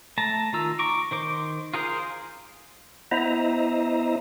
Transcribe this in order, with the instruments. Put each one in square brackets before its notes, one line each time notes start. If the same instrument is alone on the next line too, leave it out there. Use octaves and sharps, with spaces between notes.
[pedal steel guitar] A3 A5 A#5
D#3 F4 A#5 E6
A#5 C#6 D6
D#3 C5 D6
F4 G#4 A#4 C5
[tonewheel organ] B3 E4 C5 D#5 E5 A#5